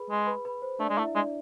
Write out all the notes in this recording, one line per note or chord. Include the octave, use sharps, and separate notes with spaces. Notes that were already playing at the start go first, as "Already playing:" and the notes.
Already playing: G#4 B4 B5
G#3
B4 B5
B4 B5
C5
A3 D4 D5
G#3
A3 E4 E5
G#3 D4 D5